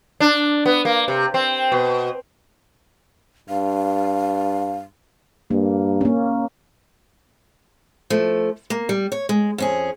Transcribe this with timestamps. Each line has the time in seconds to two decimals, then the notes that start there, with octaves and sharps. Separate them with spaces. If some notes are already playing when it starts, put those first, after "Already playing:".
0.20 D4
0.66 B3
0.85 A#3
1.08 C3
1.34 C4
1.72 B2
3.49 G2 F5
5.51 G2 A#3
6.01 A#3 C#4
8.10 F3 A3
8.70 A#3
8.89 G3
9.12 C#5
9.29 G#3
9.58 F2 C#4 G#4